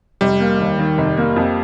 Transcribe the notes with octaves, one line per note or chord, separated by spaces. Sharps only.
F1 G3
A#3
D#2
D#3
F1
A#3
F2